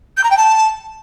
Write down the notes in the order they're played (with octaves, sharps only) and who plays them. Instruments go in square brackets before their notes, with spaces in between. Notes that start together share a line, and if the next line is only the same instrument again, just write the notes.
[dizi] G6
A#5
G5
A5